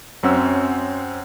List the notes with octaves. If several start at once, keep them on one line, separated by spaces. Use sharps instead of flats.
F#2 C4 C#4 F#5 E6